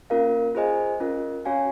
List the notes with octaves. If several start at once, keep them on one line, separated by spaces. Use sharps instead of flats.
A#3 C#4 F4 A#4 F5
F4 G#4 C5 D#5 G#5
C#4 F4 A#4
C#4 F#4 C#5 F5 G#5